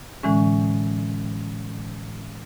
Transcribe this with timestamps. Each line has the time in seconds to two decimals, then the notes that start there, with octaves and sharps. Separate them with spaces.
0.23 A2 D3 E3 G#3 C#4